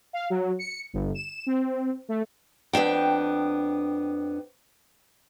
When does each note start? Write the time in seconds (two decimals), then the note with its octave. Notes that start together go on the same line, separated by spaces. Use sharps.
0.13 F5
0.30 F#3
0.59 C#7
0.93 G1
1.15 E7
1.47 C4
2.09 A3
2.73 F2 B3 D4 G5